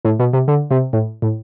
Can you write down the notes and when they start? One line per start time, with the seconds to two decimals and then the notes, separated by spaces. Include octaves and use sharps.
0.05 A2
0.19 B2
0.33 C3
0.48 D3
0.71 C3
0.93 A2
1.22 A2